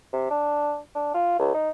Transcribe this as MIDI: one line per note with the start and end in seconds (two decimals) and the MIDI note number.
0.13 0.26 48
0.30 0.78 62
0.95 1.10 62
1.14 1.35 65
1.39 1.53 37
1.54 1.70 63